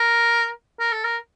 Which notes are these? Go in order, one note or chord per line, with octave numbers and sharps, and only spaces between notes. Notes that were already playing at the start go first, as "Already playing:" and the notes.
Already playing: A#4
A#4
A4
A#4